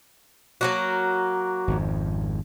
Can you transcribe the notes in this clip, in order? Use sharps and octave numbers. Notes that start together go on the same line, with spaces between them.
F#3 A#3 F#4
G#1 F2